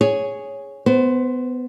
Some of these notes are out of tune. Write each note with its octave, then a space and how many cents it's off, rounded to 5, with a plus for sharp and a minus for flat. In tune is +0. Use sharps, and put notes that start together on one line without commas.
G#4 +0 C#5 +0
B3 +20 C5 +0